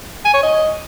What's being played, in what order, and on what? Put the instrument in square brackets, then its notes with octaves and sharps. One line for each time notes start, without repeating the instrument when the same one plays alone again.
[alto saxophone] G#5
C#5
D#5